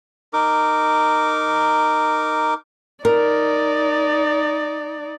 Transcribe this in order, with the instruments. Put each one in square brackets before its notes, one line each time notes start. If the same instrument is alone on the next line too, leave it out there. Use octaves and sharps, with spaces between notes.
[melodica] D#4 A#4 D6
[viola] D#4 D5 [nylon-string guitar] A#4